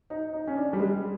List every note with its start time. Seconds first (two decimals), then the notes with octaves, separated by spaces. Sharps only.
0.10 D#4
0.33 D#4
0.47 C#4
0.56 D4
0.73 G3
0.79 G#3